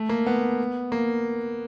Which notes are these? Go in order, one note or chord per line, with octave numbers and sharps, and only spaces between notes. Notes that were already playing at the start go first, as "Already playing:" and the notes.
Already playing: A3
A#3
B3
A#3